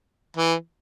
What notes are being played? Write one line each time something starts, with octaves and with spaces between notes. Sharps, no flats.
E3